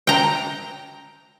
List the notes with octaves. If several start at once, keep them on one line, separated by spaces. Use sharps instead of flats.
G5 A#5